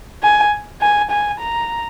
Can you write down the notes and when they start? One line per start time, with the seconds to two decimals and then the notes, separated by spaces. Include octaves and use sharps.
0.23 G#5
0.82 G#5
1.11 G#5
1.40 A#5